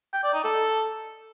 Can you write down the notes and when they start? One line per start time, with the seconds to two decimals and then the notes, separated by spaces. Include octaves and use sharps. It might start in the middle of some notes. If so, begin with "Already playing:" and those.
0.13 G5
0.23 D5
0.34 D#4
0.44 A4